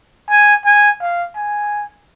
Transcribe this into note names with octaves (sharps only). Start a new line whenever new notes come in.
G#5
G#5
F5
G#5